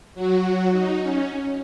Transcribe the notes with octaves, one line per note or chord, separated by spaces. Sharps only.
F#3 F#4
D#4
C#4